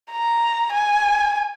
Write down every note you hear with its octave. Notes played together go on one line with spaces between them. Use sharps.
A#5
G#5